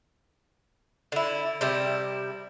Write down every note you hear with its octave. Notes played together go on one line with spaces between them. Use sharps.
D3 E4
C3 G3 E4